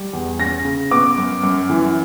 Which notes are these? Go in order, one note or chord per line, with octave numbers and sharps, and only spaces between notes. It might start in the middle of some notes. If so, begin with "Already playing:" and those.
Already playing: G3
E2
C#4 A#6
C#3
B3 D6
F#2
F#2
E3